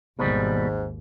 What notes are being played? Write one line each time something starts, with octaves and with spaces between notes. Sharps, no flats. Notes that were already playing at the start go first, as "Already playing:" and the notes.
G#1 D#2 G#2 B2 G3